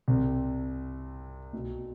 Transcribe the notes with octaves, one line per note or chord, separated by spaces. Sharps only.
C2 C3
B1 B2